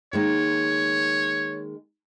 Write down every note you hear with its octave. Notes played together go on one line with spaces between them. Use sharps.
D#3 G#3 A#3 C#5